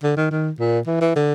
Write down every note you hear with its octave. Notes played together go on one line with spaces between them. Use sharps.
D3
D#3
D#3
A#2
E3
E3
D3